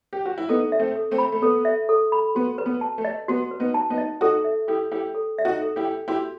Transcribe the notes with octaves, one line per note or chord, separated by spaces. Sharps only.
G4
F#4
E4
B3 D#4 A4
E5
A3 C4
A4
A3 C4
B5
A3
B3 A4
E5
A4
B5
B3 F#4
B4
B3
A5
A3
D#5
B3 F#4
B4
B3 D#4
A5
B3 D#4
D#5
D#4 F#4 A4
E5
E4 G4 A4
E4 G4 G5
A4
E5
D#4 F#4
A4
E4 G4
G5
E4 F#4 G4